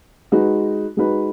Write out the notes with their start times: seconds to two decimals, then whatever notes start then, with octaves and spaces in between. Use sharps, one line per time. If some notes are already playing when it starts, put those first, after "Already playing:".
0.32 G#3 D#4 F#4 B4
0.97 G#3 D#4 F#4 B4